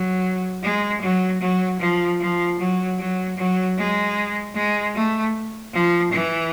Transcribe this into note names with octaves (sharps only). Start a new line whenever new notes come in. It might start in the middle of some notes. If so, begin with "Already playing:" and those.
Already playing: F#3
G#3
F#3
F#3
F3
F3
F#3
F#3
F#3
G#3
G#3
A3
F3
E3